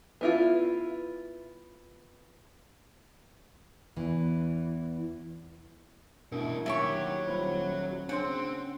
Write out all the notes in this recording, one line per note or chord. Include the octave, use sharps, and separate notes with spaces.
B3 E4 F4
E2 E3
A1 B2 D4 E4 A#4
D#2 F#3 E4 G4 C#5 C#6
D#1 F4 C5 B5
C#3 C4 D4 C#5 F#5 C6